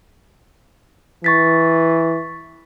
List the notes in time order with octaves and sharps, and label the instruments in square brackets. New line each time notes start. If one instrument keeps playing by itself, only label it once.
[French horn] E3 [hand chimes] C#6 A6 B6